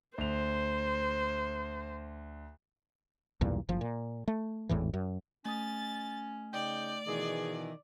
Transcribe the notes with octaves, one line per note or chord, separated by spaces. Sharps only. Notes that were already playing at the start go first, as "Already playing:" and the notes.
D2 C5 F7
B1 E2 G2 A#2
F#1 F3
A#2
A3
G#1 E2 A2 E3
F#2
A3 C#4 D#6 A6
C#3 D#4 D5 G5
B2 D#3 E3 G#4